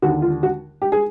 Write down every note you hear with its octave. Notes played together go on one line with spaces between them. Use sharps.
D#2 D3 F#4
F4
F#4
G4
G#4